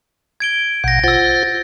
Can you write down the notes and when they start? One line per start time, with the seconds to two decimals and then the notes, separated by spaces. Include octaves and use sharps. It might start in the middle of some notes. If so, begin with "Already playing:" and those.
0.40 G#6 D7 G7
0.84 A#1 B2 F#5 G6 A#6
1.04 F4 C5 F#5 E6 A6